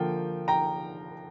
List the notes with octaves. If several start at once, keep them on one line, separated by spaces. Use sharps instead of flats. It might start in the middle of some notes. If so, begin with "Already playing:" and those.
Already playing: D3 F3 A#3 G5
G5 A#5